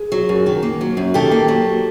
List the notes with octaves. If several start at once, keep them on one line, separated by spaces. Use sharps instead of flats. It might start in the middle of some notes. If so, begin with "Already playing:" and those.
Already playing: G#4
F#3
F#2
D#3
A#3
F#3
F#2
D#3 G4 A4
A#3
F#3